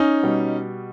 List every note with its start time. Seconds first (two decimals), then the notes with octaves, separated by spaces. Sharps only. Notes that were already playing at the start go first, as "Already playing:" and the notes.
Already playing: C#4 D#4
0.23 B2 G3